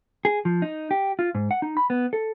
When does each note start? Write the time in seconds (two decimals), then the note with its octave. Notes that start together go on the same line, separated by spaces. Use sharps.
0.25 G#4
0.45 F3
0.62 D#4
0.91 G4
1.19 F4
1.35 G#2
1.51 F#5
1.62 D#4
1.77 B5
1.90 B3
2.13 A4